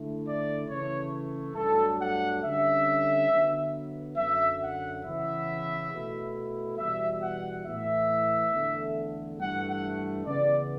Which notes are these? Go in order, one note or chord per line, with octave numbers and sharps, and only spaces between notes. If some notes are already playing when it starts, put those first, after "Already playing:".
Already playing: D3 A3 E4
D5
C#3 E3 A3 C#5
G2 F#3 A3 D4 A4
F#5
D3 G3 C#4 E5
D3 F#3 B3
F#2 D3 F#3 E5
F#5
E2 C#3 E3 B3 E4 E5
B2 A3 E4
E2 B2 G3 E5
F#5
A2 E3 B3 E4 E5
E2 D3 A3
G2 E3 A3 F#5
F#5
C#3 E3 B3 D5